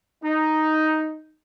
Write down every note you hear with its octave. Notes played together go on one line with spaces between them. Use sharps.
D#4